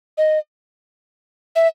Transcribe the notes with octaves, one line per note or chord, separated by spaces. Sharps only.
D#5
E5